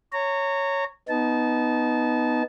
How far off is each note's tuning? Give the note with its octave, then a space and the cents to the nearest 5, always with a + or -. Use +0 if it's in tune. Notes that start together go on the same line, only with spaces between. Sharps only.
C#5 +0 A#5 -25
B3 +0 D#4 +0 A5 -25